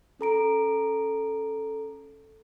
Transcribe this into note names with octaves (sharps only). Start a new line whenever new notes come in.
C#4 A4 A#5 D7